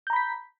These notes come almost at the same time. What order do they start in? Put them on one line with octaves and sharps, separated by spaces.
G6 A#5 B5 B6